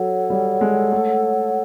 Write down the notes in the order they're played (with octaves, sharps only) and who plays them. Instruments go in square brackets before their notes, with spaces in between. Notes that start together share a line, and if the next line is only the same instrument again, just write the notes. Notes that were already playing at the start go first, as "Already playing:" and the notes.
Already playing: [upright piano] F#3 [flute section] A4 C#5 F#5
[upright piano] G3
G#3
A3